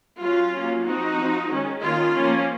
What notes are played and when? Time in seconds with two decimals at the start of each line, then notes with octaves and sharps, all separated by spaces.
0.21 F#3 C#4 F4
0.53 F#3 A#3 C#4
0.85 F3 C4 D#4 F#4
1.17 F3 C4
1.50 D#3 G#3 C#4
1.82 D#3 A#3 C#4 F4
2.14 F3 A#3 C#4